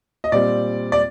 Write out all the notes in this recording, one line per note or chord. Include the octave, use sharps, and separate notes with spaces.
D#5
A#2 G3 C4 D5
D5